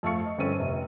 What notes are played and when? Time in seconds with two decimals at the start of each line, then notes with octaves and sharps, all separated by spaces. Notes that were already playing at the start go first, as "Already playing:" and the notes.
0.03 F2 A3 A4 F5 C#6 C#7
0.26 D#5
0.38 G1 C4 C#4 A4 D#7
0.59 F1 C3